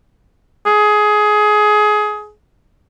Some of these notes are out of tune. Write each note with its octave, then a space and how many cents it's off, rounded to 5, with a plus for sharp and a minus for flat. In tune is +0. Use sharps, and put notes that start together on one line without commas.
G#4 +20